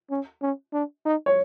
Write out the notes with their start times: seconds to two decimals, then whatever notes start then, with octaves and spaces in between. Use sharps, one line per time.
0.10 C#4
0.42 C#4
0.73 D4
1.05 D#4
1.26 C#5